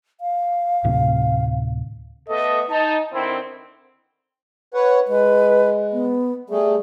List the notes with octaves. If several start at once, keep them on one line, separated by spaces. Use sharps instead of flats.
F5
D2 A2 C3
A3 B3 A4 D#5
D#4 A5
D3 D#3 C4 E4
B4 C#5 F#5
G#3 B4
B3
G3 A3 G#4